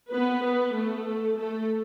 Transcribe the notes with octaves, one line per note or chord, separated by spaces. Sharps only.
B3 B4
B3 B4
A3 A4
A3 A4